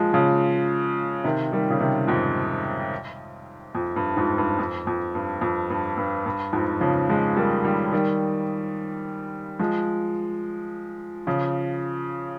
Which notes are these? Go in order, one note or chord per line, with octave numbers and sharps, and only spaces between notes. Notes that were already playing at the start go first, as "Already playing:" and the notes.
Already playing: F3 G#3
C#3 F3
C3 D#3
D#3 G3
C#3
C3 D#3
F2 G#2
F2
G2
F2 G#2
G2
F2
F2
G2
F2
G2
G2
G2
F2 G#2
C#3 F3
F3 G#3
G3 A#3
D#3 G3
D#3 G3
F3 G#3
C#3 F3